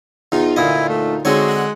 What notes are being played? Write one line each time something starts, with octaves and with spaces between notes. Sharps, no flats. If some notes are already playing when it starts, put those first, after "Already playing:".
E2 D#4 F4
D2 A#2 E4 D#5
A3
D3 G#3 C4 D#4 F#4 G#4 C#5
F#5 F#6